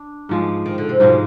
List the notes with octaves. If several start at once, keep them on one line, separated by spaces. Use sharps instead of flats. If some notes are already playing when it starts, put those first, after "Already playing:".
Already playing: D4
G#2 F3 G#3
D#3
D3
C3
G#2 B2 F3 G#3